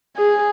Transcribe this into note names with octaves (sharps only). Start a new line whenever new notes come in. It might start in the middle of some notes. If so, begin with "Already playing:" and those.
G#4